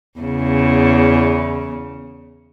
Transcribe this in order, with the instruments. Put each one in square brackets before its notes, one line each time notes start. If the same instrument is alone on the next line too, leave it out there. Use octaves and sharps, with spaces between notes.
[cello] E2 C#3